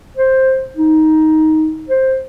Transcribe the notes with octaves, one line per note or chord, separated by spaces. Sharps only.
C5
D#4
C5